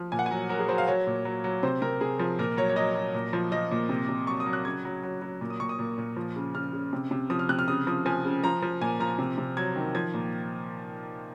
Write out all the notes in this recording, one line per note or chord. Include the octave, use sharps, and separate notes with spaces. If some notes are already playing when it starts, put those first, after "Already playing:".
Already playing: F3
A#2 G#5
F#5
G#5
F#3
F#3 A#4
G#4
F#3 C5
F5
F#3 C#5
A#2
F#3
F#3
C3 C5
C3 A#4
C3 G#4
F3
A#2 A#4
F#3 C#5
C#5
F#3 D#5
F#3
A#2
F3
F3 D#5
A#2
C3
C3
F#3 C#6
D#6
F#3
F#6
C#3 G#6
F#3
F#3
F#3
A#2
D#6
A#2 C#6
D#6
A#2
A#2
F3
C#3
C#3 F6
C#3
C3
C3
F3 D#6
F6
C3 F#6
F6
C#3 D#6
F3 D#6
F3 G#5
C#3
F3 A#5
F3
A#2 G#5
F3 A#5
C3
C3
F#3 G#6
D#3
F3 G#6
A#2